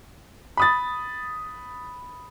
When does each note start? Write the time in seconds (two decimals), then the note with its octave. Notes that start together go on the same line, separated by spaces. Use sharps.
0.57 B5 D#6 A6